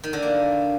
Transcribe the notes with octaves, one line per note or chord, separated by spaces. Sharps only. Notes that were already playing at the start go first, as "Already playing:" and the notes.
D#3
D3
A#3